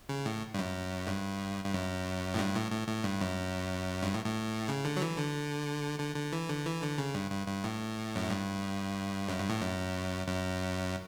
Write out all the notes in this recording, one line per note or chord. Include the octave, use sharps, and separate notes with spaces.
C#3
A2
G2
F#2
G2
G2
F#2
A2
G2
A2
A2
A2
G2
F#2
G2
A2
A2
C#3
D3
F#3
E3
D3
D3
D3
E3
D3
E3
D3
C#3
G2
G2
G2
A2
F#2
G2
F#2
G2
A2
F#2
F#2